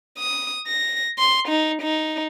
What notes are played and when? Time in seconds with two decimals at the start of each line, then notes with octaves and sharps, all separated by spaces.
0.18 D#6
0.67 A#6
1.19 C6
1.48 D#4
1.82 D#4